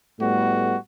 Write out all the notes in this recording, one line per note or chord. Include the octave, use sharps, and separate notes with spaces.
A2 G3 A3 B3 F#4